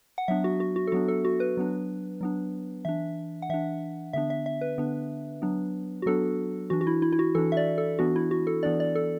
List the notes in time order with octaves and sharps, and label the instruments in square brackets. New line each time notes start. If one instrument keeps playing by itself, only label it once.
[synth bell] F#5
F#3 B3 D4 E5
F#4
F#4
F#4
A4
F#3 B3 D4 F#4
A4
F#4
B4
F#3 B3 D4
F#3 B3 D4
E3 D4 E5
F#5
E3 D4 E5
D3 B3 D4 E5
E5
E5
B4
D3 B3 D4
F#3 B3 D4
F#4
F#3 B3 D4 A4
E3 D4 F#4
F#4
E4
E4
E4
F#4
E3 D4 A4
E5
D5
A4
E3 B3 D4 F#4
E4
F#4
A4
E3 B3 D4 D5
D5
A4